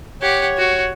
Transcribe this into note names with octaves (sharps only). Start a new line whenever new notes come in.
G4 C#5 F#5
F#4